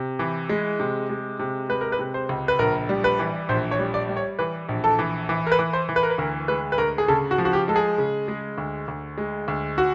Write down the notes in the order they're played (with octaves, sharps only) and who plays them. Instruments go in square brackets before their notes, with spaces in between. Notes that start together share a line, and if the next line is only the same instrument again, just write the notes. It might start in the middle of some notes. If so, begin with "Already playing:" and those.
Already playing: [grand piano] C3
E3
G#3
C3
G#3
C3
G#3 B4
A#4
B4
C3
C5
C#2
B4
A#1 A#4
G3
B4
E3
A#1 C5
C#5
G3
D5
G3
C#5
E3 B4
A#1
A4
E3
E3
A#4
B4
E3
C5
E3
B4
A#4
B4
D2 A#4
G#3 B4
B4
D2 A#4
G#4
C#3 A4
F#4
F3
F#4
G4
G#3 A4
G#4
C#3
G#3
D2
D2
G#3
D2
F#4